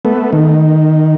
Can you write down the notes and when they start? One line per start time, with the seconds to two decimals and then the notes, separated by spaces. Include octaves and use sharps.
0.05 A3 B3
0.33 D#3